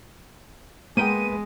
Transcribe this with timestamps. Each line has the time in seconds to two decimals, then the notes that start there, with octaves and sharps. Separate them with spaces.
0.97 G#3 A#3 B3 G5 D#7